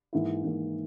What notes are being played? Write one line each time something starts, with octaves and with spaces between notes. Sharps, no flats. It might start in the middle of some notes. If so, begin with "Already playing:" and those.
G#2 E3 A#3 E4
G#2 E3 A#3 E4